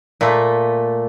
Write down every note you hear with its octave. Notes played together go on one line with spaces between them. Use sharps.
A#2 A3